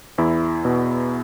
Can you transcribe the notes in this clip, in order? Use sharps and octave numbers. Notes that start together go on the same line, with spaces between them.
E2 E4
B2